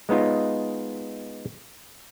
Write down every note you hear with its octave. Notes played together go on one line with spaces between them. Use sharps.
G#3 B3 D#4 F4